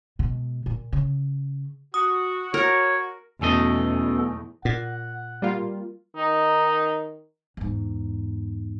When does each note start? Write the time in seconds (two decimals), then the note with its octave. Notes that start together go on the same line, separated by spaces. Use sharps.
0.19 B2 G#3
0.66 A#2
0.92 C#3
1.94 F#4 D#6
2.54 A#4 C#5
3.42 B1 E2 B2 A3 C#4 A4 D#5
4.65 A#2 F#5
5.42 G3 A#3 F4
6.16 D#3 D#4
7.57 E2 G#2